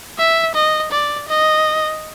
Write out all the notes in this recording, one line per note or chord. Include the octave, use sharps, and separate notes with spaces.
E5
D#5
D5
D#5